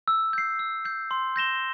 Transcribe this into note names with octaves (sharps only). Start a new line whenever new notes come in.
E6
G6 C7
E6
G6 C7
C6
G6 A#6 E7 G7